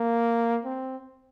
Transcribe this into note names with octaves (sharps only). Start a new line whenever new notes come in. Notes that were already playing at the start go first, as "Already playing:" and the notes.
Already playing: A#3
C4